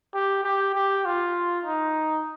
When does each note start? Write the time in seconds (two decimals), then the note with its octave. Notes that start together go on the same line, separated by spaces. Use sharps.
0.14 G4
0.44 G4
0.75 G4
1.05 F4
1.65 D#4